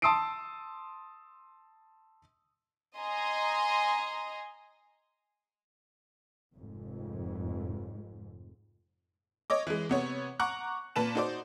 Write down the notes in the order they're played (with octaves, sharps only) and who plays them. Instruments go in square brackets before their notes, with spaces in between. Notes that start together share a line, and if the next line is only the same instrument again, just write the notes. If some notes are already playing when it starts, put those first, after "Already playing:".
[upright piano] A5 C6 D#6 E6 C7 D7
[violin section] D#5 G#5 A#5 C6
[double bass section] F1 F2 G#2
[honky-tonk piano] C#5 D#5 D6
E3 G#3
C3 B3 C#5
F#5 A#5 C#6 D6 F#6
A#2 B4 A5 E7
D#4 F#4 C5 D5 D6